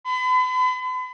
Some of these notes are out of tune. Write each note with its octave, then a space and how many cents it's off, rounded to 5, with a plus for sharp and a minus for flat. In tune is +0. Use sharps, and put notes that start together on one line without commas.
B5 +40